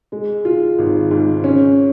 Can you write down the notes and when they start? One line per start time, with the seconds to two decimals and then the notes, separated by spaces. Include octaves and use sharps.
0.12 G#3
0.45 F4
0.78 G#1
1.11 G#2
1.44 C#4